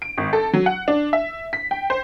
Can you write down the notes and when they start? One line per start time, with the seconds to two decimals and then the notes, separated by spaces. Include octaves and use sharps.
0.02 D7
0.18 G#1
0.33 A4
0.53 F#3
0.66 F#5
0.88 D4
1.13 E5
1.53 B6
1.71 G5
1.90 C5